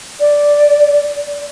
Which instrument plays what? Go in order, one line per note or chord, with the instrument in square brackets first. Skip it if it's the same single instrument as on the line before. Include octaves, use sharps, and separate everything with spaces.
[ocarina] D5